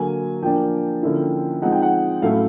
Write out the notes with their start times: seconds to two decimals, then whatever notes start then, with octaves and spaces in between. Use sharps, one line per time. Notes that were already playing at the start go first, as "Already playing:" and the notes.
Already playing: D3 F#3 A#3 G#5
0.43 F3 A#3 D4 G5
1.03 D3 F3 A#3 C#4 E4
1.62 F3 G#3 C4 D#4 F#5
1.72 G5
1.82 F#5
2.22 A2 F#3 A3 C#4 E4 F5